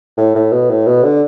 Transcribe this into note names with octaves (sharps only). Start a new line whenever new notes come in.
A2
A2
B2
A2
B2
D3